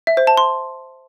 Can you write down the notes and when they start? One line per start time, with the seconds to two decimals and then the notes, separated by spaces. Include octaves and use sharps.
0.07 E5
0.17 C5
0.27 A5
0.37 C6